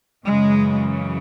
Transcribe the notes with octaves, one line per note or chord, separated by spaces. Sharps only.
F#2 C#3 E3 G#3